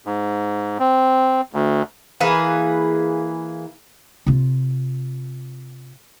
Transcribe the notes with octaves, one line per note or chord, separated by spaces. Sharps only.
G#2
C4
D2
E3 A#3 G#4 B4
C3 F4